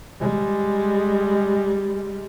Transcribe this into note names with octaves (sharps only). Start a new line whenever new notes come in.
G3 G#3